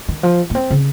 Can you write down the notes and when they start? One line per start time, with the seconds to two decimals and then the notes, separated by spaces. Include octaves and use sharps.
0.08 D#3
0.23 F3
0.50 A#3
0.55 C4
0.71 C#3